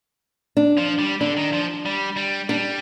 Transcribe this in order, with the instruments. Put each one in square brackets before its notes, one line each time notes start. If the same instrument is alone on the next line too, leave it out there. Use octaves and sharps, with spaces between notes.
[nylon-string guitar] D4
[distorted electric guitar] F3
G3
[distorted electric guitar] D3 [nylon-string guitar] D4
[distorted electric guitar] D#3
F3
G3
G3
[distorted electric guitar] G3 [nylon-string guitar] D4